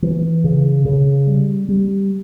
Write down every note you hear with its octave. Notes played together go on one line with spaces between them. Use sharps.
E3
C#3
C#3
G3
G3